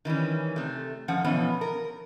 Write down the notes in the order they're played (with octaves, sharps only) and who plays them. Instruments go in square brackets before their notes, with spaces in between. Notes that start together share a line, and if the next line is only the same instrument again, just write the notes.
[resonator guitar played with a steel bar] D#3 E3 G3 C#4
C3 A3
F#2 F3 C#4 F#5
B2 E3 F3 B3 C#4
A#4